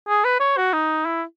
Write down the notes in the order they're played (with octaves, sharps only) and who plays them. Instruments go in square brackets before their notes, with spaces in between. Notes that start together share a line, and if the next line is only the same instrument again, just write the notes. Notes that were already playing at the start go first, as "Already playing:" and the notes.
[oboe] G#4
B4
C#5
F#4
D#4
E4